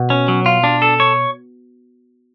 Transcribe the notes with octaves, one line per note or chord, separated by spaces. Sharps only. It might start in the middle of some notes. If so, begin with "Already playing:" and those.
Already playing: B2
C#4
F#3
F4
D4
A4
C#5